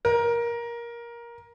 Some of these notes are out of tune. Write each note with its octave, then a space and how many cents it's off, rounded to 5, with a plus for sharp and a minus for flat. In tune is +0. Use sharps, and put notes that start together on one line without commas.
A#4 +15